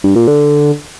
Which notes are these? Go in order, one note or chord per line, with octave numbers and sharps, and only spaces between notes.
G2
A#2
D3